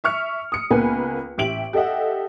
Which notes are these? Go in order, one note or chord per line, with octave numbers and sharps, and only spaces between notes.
E5 C#6 F6 C#7
D#6 C#7
C#2 A#3 B3 B4 G#5
A1 G4 E5 D7 F#7
G4 A4 D#5 E5 F#5